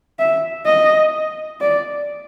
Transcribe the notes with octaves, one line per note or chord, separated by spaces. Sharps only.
E5
D#5
D5